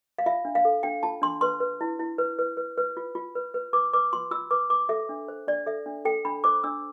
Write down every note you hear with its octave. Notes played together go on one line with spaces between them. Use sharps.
F5
F4 E5
D4
F5
A4
D4 G5
F4 A5
D4 C6
B4 C6
B4
E4
E4
B4
B4
B4
B4
F4
F4
B4
B4
B4 D6
B4 D6
F4 C6
F4 E6
B4 D6
B4 D6
A4 E5
D4
C5
D4 D5
A4 E5
D4
A4 G5
D4 B5
C5 D6
D4 E6